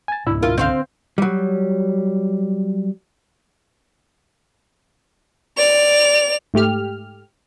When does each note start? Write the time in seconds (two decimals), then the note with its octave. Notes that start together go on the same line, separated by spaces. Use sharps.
0.08 G#5 A6
0.27 C#2 G#2 B2 D4 E4 E5
0.42 F4 A#4
0.58 D3 C4 C5 F5 G6
1.18 F#3 G3
5.57 D5 F7
6.54 G#2 A3 G4 F6